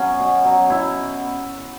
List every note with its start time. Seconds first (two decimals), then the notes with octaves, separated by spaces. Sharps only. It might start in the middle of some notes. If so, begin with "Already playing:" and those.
Already playing: F#3 B3 C#4
0.20 B2
0.45 F#3
0.70 B2 E4